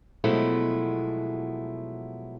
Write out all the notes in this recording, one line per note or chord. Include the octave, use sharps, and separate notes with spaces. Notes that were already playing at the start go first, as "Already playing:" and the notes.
B2 F3 F#3 G#3 A3 E4